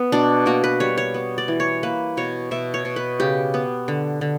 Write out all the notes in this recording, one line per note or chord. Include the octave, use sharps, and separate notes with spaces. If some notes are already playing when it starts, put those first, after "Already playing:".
Already playing: B3
B2 D4
A#3 F#4
B4
G3 C#5
C#5
B3
D5
E3
C#5
A#3 B4
B2 C#5
B2 E5
C#5
B2
B4
C#3 G4
B3
D3
D3